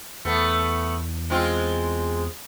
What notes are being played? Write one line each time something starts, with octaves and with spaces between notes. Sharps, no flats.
E2 A3 B3
G#3 C4 F4